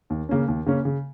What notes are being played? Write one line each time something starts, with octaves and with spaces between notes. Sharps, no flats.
D#2
C#3 A#3 C#4
D#2
C#3 A#3 C#4
C#3